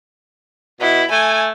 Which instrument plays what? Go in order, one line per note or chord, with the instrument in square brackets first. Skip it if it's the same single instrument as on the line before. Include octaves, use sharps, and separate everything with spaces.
[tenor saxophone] B2 [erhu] E4
[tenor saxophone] A3 [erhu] G#5